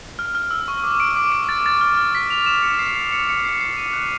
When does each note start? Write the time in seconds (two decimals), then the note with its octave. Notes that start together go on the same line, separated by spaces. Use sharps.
0.19 F6
0.35 F6
0.51 E6
0.68 C#6
0.84 D6
1.00 D7
1.16 D6
1.32 D7
1.49 A6
1.66 A6
1.81 F6
1.97 F6
2.15 B6
2.30 F7
2.46 E7
2.62 C#7
2.79 C7
2.96 C7
3.12 C#7
3.29 C#7
3.45 C7
3.61 C7
3.77 D#7
3.93 F#6